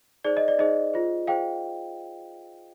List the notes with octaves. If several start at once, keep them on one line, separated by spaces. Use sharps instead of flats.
D#4 G#4 C5 D5
D#5
D5
D#4 G#4 C5 D#5
F4 G#4 C5
F4 G#4 C5 F5 G5